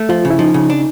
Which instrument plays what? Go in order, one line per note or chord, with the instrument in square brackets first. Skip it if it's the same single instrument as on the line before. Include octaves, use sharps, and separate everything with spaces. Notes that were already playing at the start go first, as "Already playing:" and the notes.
Already playing: [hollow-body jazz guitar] A3
[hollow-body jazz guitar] F3 [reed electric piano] F4
[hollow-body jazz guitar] C#3
[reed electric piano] E4
[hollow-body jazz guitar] F3 [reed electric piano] D#4
[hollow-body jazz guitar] C#3
D4